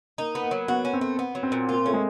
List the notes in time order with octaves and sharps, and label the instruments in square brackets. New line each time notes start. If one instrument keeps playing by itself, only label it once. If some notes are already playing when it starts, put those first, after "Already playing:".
[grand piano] A#3 [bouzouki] D#4
[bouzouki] B3
[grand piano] A#3
[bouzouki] F#3
[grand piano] B3 [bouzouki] F#4
[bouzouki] C#4
[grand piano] C4
[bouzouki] A3
B3
F#3
[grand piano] C4
[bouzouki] A#2
[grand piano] A#3 [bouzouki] F4
[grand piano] A3 [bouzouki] C#4
[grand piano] G#3